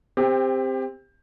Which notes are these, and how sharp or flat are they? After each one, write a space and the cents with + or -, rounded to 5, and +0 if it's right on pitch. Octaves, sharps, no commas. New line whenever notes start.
C4 +0 G4 +25